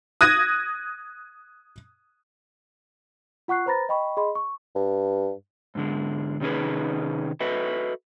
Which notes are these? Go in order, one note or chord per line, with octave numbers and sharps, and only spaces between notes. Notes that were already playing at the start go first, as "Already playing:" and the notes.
D#6 F#6 G#6 A#6 D#7
F4 F#5 C#6 F#6 C7
B4 C5 A#5 B5 A6 A#6
D#5 G5 B5 C#6
G#4 D#5 B5 C6
C#6
G2
G#2 D3 G#3
C3 D#3 C#4 D#4 G#4 B4
F#4 A4 B4 D#5 E5